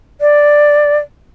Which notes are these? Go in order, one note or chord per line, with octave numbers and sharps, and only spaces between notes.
D5